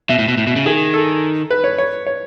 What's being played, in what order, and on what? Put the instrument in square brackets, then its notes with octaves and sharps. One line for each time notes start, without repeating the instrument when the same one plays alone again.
[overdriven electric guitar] B2 [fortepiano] E5
[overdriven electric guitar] A2
B2
A2
B2
C#3
[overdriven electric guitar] D#3 [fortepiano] G#4
[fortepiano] A4
B4
C#5
C#5
C#5